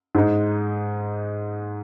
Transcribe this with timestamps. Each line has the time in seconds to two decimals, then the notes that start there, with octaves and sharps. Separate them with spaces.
0.15 G#2 G#3 D#4